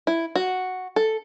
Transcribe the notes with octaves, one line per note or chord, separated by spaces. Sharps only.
E4
F#4
A4